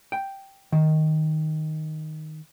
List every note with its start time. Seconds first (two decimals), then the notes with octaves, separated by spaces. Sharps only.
0.12 G5
0.72 D#3